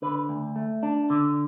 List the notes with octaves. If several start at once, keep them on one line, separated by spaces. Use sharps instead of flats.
D3 B4
D2
A3
D4
D3